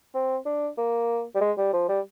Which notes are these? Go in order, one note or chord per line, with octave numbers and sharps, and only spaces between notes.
C4
D4
A#3
G3
G#3
G3
F3
G3